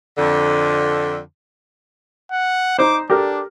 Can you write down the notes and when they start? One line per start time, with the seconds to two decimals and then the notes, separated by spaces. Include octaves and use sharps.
0.18 F2 D3
2.31 F#5
2.79 D#4 C5 D6
3.10 D4 G4 A4 A#4